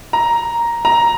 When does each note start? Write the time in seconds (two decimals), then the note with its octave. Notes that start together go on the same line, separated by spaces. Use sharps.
0.13 A#5
0.85 A#5